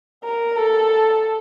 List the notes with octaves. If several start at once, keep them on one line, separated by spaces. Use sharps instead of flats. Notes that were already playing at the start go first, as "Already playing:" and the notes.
A#4
A4